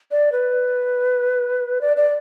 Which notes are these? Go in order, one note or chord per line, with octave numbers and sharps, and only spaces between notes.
D5
B4
D5
D5